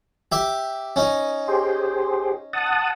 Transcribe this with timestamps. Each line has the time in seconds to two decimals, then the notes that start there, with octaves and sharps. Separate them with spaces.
0.32 G4 E5
0.96 C#4 D#4
1.48 G4 G#4 C5
2.53 F#5 A5 D#6